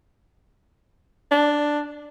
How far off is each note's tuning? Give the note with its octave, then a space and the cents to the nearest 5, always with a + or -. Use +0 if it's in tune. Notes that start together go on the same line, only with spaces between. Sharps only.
D4 +5